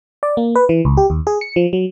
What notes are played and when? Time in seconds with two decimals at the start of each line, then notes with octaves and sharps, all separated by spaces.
0.23 D5
0.37 A#3
0.55 B4
0.69 E3
0.85 C#2
0.97 G4
1.10 D#2
1.27 G#4
1.41 C#7
1.56 F3
1.73 F#3